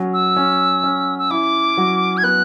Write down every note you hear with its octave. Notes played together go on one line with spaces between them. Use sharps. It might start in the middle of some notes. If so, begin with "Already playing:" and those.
Already playing: F#3 C#4
E6
C#4
C#4
E6
E4 D6
F#3
G#6
B3 F#6